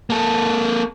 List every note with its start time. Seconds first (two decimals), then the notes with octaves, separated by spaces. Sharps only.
0.10 A#3 A4